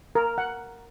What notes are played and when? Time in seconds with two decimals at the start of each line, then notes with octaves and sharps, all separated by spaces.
0.15 A#4
0.38 F#5